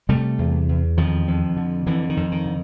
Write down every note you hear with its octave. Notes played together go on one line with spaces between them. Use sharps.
C3 G3 A3
E2
E2
F2 D#3 F3
F2
D3
F2 D3 E3
D#3
F2
D#3
D3